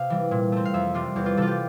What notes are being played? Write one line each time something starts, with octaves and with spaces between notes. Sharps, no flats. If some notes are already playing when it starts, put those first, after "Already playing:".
Already playing: C3 F5
E3 G3
A#2
A3 C4
F5
F2 E5
C3 G3 C4 F4
E2 G4
F4
C3 E3 G3 F4 A4
G4